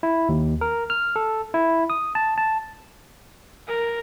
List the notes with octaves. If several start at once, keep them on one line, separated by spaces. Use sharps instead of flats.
E4
D#2
A#4
F6
A4
E4
D#6
A5
A5
A#4